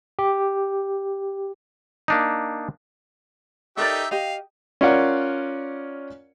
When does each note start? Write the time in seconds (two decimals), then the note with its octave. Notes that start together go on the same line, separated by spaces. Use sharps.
0.19 G4
2.08 A#3 D4 D#4
3.77 D#4 G4 A4 A#4 D5 E5
4.11 G4 D#5 F5
4.81 C#4 F4 A#4 C#5 D5 F#5